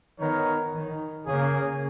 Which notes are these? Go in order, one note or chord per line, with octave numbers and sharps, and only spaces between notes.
D#3 B3 D#4 A#4 C#5
D#3
C#3 A#3 C#4 G#4